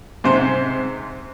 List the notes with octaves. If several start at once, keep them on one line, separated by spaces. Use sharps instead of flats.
G#2 C3 C5